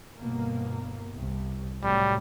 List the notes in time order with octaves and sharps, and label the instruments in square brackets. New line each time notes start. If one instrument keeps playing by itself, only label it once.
[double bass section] G1 B2 A#3
C2
[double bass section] A2 C3 F#3 [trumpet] G3